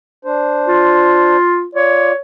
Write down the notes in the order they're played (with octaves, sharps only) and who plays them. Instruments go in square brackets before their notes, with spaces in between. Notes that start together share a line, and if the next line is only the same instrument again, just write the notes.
[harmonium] D4 C5
[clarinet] F4
[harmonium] F4 D5 [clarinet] C#5